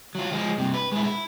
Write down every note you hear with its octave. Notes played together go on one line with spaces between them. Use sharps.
F#3 F4
F3 G#3
G2 C3
B4
G#3 E4
E4